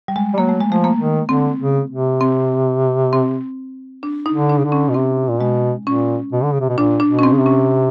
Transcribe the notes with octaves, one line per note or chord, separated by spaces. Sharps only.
G3
G#3
G3
F#3 A#3
A3
G#3
F3 A3
A#3
D#3
D3 C4
C#3
C3
C4
C4
D4
D#4
D3
D4
C#3
D3
C#4
B2
C3 C4
A#2
B2 G#3
A#2 C#4
B2
D3
C#3
C3
B2
A#2 D4
D4
B2
C#4
C4
C#3
C3
C#4